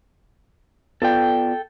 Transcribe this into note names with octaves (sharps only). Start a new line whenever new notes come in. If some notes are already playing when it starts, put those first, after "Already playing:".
B3 F4 A4 D5 G5